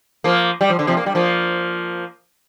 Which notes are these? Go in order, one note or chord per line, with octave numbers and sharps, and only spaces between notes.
F3 A#3
G3
F3
D3
C3 F3
A#3
G3
F3 A#3